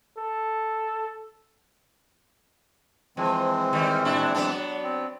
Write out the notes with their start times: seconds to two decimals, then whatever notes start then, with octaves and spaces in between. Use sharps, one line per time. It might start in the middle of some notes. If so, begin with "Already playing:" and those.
0.18 A4
3.17 E3 F3 G#3 C4
3.73 D#3 G3
4.05 A#2 D4 E4
4.35 F#3 B3 D4
4.83 C4